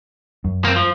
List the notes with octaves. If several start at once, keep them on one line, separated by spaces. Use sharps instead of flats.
F#2
A#3 C4
F3